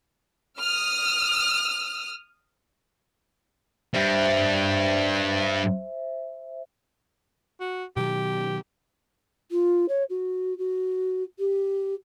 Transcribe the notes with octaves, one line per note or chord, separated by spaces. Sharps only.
D#6 F6
G2 G3 C5 E5
F#4
B2 D#3 F#3 G4
F4
C#5
F#4
F#4
G4